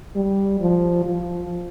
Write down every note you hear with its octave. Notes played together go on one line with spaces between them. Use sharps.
G3
F3
F3